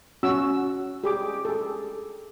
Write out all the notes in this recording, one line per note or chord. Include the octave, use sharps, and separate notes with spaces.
C#4 F#4 E6
G4 G#4 D6
G#4 A4